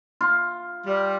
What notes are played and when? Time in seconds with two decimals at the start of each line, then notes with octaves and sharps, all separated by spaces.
0.21 F4
0.86 G3